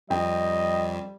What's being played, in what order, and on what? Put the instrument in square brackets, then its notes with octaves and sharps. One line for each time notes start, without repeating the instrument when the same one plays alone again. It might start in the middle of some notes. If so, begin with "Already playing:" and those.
[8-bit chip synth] F2 [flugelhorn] G3 [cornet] D#5 [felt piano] G5